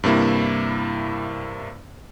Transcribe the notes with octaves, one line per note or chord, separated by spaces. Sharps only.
G2 C3 A#3 E4